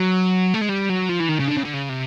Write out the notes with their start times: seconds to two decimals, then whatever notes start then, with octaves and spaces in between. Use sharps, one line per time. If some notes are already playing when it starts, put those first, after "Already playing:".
Already playing: F#3
0.54 A3
0.61 G#3
0.69 G3
0.90 F#3
1.09 F3
1.20 E3
1.29 D#3
1.39 C#3
1.48 D3
1.57 C#3
1.65 D3
1.73 C#3
1.89 C3